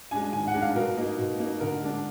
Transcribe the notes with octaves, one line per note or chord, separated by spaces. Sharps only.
G#3 D4 G#5
D#3 G#5
F#5
G#3 D4
F5
B2 A#4
A#3 D#4
B2
A#3 D#4
D3 A#4
G#3 D4